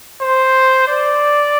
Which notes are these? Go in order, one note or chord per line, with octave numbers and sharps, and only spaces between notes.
C5
D5